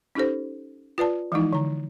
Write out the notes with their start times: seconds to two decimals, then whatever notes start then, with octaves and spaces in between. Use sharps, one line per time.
0.15 C#4 D#4 G4 A4 C5
0.98 F4 B4 D5 A5
1.32 E3 F3 G#3 D#4 E4
1.53 D3 A#5